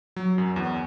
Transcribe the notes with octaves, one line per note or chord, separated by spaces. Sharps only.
F#3
F#2
E2